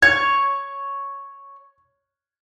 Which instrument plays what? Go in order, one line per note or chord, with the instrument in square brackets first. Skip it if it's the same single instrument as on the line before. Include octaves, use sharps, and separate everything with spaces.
[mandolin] C#5 [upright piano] G#6